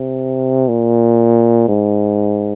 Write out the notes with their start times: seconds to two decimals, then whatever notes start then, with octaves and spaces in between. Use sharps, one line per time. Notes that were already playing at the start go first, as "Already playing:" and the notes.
Already playing: C3
0.69 A#2
1.68 G#2